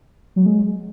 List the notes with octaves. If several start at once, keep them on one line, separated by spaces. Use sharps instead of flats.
F#3
G#3